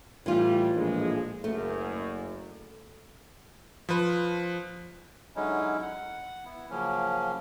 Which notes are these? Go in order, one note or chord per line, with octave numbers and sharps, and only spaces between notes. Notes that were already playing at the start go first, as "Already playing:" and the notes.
A2 E3 G3 F4
A#1 A2 G#3
F#1 F#2 A3
F3 B4
D3 F#3 G#3 C#4 D#4 E4
F#5
B3 E4
C#3 F3 F#3 A#3 C#4